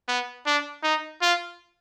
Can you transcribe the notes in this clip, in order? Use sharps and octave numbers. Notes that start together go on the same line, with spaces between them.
B3
D4
D#4
F4